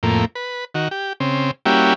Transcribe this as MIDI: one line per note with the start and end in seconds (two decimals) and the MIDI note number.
0.03 0.25 41
0.03 0.25 45
0.03 0.25 58
0.35 0.65 71
0.75 0.88 51
0.75 0.88 66
0.91 1.13 67
1.20 1.51 49
1.20 1.51 60
1.66 1.94 55
1.66 1.94 58
1.66 1.94 61
1.66 1.94 64
1.66 1.94 66
1.66 1.94 67